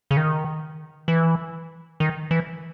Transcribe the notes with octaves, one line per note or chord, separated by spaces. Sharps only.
C#3
D#3
E3
D#3
E3